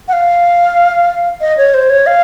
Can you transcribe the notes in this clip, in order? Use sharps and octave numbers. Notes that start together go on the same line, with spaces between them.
F#5
F5
D#5
C#5
C5
C#5
F5